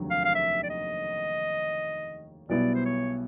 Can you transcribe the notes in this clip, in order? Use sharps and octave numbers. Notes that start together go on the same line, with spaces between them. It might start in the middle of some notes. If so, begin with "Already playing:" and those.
Already playing: F1 D#2 D3 F#3
F5
F5
E5
D5
D#5
B1 B2 G3 B3 E4 D5
C5
C#5